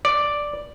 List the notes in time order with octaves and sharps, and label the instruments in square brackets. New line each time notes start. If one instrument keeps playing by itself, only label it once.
[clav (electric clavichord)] D5